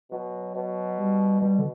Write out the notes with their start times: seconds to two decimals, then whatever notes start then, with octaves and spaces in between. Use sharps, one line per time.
0.11 B2 F#3
0.55 B2
0.98 G3
1.41 B2 G3
1.59 D3